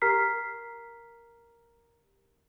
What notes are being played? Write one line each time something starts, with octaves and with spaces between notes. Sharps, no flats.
G4 A#4 A#5 F6 B6 C7